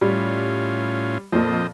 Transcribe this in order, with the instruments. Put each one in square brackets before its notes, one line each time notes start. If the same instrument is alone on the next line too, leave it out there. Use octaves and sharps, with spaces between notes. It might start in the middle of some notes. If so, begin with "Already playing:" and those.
[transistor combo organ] A2 C#4 F4 [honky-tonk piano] G3
[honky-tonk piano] F2 A#2 [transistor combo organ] F3 C4 D#5